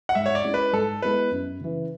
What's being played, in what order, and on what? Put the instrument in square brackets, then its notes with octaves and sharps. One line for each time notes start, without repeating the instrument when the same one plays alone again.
[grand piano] F#5
[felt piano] G#2 [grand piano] E5
[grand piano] C#5
D5
[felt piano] G#3 C#4 E4
[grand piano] B4
[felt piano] G#2 [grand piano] A4
[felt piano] G#3 B3 E4 [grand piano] B4
[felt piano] F#2
C#3 E3